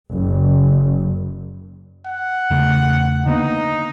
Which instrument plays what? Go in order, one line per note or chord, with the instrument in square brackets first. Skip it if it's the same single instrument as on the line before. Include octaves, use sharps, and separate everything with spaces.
[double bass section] F#1
[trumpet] F#5
[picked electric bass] E2 C#3 A3
[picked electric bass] D3 A#3 B3 [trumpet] D#4